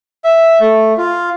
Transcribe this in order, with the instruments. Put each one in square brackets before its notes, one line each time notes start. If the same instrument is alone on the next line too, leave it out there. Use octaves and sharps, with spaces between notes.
[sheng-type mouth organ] E5
A3
F4